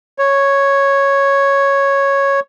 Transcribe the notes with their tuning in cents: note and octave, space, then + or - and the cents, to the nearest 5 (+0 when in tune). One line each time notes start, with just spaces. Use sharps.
C#5 -5